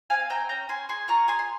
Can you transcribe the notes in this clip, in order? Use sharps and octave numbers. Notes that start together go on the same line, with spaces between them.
C4 F5 G#5
C4 G5 A#5
C#4 G5 A#5
C#4 G#5 C6
G#4 G#5 C6
F4 A#5 C#6
G#4 G#5 C6
C6